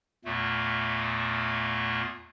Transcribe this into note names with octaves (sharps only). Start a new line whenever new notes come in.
E2 A#2 A3